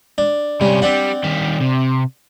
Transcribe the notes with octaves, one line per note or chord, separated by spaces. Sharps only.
D4
C3 G3 C#4
G3 C4 D4 F#5
D#3 G3
C3